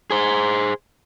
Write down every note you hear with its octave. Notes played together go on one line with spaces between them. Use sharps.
G#4 C5